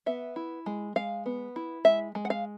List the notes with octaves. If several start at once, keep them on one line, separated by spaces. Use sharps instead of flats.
B3 E5
E4
G#3
G#3 F5
B3
E4
G#3 E5
G#3
F#5
F5